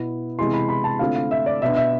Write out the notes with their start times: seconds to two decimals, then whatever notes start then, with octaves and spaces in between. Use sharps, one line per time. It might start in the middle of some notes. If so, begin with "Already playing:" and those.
Already playing: B2 B3 E4
0.38 C3 E3 G#3 B3 E4 C6
0.54 B5
0.69 B5
0.84 A5
0.99 D3 A3 C4 F4 F5
1.15 F5
1.31 E5
1.46 D5
1.62 B2 B3 D4 E5
1.76 E5